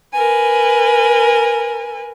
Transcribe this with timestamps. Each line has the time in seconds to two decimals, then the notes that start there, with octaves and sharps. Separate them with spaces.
0.13 A#4 B4 G#5